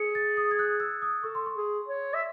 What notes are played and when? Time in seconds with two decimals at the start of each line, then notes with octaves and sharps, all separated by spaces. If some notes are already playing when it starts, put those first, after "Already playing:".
Already playing: G#4 C#7
0.15 A6
0.37 D#6
0.51 G#6
0.59 F#6
0.80 E6
1.02 D#6
1.23 A4 C#6
1.35 C6
1.46 C#6
1.56 G#4
1.88 C#5
2.14 E5